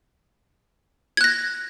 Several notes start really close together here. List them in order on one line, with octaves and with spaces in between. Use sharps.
G#6 F#6 A#6